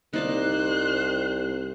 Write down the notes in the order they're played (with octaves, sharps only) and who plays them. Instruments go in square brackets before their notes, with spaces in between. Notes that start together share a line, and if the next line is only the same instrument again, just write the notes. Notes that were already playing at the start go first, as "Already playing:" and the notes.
[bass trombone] C2 [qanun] D#4 D5 F5 [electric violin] C5 F#6